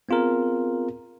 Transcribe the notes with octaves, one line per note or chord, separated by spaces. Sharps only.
B3 C4 F4 G#4 A#4